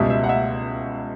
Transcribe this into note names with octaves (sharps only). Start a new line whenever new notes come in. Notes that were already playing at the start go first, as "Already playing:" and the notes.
Already playing: C#2 B2 G3 E5
E5
F#5
E5